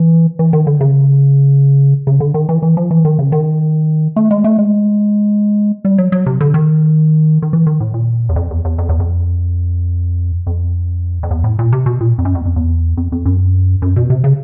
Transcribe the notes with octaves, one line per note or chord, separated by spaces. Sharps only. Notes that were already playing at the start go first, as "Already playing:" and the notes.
Already playing: E3
E3
D#3
D3
C#3
C#3
D3
D#3
E3
E3
F3
E3
D#3
C#3
D#3
A3
G#3
A3
G#3
G3
F#3
F#3
C3
D3
D#3
D#3
E3
D#3
A2
A#2
E2
F2
E2
E2
F2
E2
F2
F2
F2
E2
A2
A#2
C3
B2
A#2
F2
F#2
F2
F2
E2
F2
F2
F#2
F#2
B2
C3
C#3